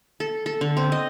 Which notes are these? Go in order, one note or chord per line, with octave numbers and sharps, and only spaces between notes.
A4
A4
D3
C4
D#5